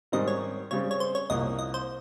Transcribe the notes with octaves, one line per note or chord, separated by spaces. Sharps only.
G#2 D#3 G3 C4 D#5
C#5
C#3 G3 C4 C#5
C#5
C5
C#5
C2 A#2 F3 A#3 D#5
D#5
C5